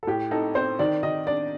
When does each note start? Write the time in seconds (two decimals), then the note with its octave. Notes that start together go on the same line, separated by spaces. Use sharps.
0.03 A4
0.07 A2 G4
0.31 D#4 A4
0.55 C4 C5
0.79 D#3 D5
1.03 D#3 D#5
1.27 D4 D5